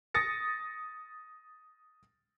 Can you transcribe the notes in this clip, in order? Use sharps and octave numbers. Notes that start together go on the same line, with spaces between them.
D#6 A6 A#6 C#7